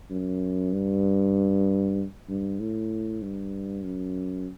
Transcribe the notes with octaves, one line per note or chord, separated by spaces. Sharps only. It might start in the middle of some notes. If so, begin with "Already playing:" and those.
F#2
G2
G2
A2
G2
F#2